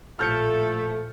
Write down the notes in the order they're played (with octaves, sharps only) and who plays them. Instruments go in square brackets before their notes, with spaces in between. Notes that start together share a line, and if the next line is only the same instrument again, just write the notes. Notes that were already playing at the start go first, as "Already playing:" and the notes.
[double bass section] A#1 A2 [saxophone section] F3 A3 [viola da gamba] A4 [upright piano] F6 G6 C#7